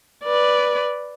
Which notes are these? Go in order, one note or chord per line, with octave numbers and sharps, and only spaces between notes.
B4 D5